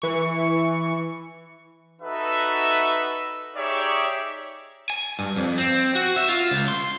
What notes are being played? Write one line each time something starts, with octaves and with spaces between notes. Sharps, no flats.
E3 C#6
D#4 F#4 A4 B4 E5
D#4 G4 G#4 C#5 D5 E5
G#5
G2
F2
C4
F#4
E5
F4
C#2
C6